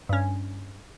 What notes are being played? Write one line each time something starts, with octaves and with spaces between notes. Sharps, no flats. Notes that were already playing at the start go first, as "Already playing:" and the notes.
G2 C#4